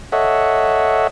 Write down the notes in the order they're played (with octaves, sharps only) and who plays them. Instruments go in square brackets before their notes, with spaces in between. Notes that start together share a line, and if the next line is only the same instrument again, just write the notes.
[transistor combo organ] A4 C#5 D#5 E5 F#5